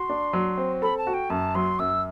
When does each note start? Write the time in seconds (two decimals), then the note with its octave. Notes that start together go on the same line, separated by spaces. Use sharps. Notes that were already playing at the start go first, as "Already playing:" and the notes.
Already playing: F#4 C6
0.09 D4
0.33 F#3
0.57 C4
0.82 A4 B5
0.98 A5
1.07 F#4
1.14 G5
1.30 F#2 A5
1.55 F#3 C6
1.79 F#2 E6